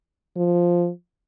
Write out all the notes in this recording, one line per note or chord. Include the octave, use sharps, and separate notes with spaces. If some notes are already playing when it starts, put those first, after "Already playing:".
F3